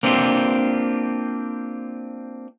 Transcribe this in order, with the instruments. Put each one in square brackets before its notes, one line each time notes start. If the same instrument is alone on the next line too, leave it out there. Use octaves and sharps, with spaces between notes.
[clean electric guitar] A#3 C4 D4 F4 G4